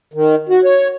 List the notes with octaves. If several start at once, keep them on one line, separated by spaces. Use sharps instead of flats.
D#3
F#4
C#5